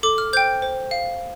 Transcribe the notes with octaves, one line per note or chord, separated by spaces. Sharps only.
A4 D6
F6
C5 G5 G6
C5
F5